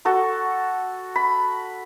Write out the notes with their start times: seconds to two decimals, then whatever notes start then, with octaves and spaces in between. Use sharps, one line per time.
0.05 F#4 A4 C#6
1.16 B5